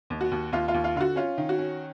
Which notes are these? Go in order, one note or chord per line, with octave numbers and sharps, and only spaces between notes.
D#2
F#4
D#2
D#2 F4
F4
D#2
F4
D3 F4 F#4
C#4 F4
D#3
F#4
C#4